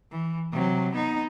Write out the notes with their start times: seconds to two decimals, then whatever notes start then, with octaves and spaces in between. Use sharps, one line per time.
0.11 E3
0.51 C3 F#3
0.94 B3 D#4